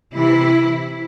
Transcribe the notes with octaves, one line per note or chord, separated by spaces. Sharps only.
C3 E3 E4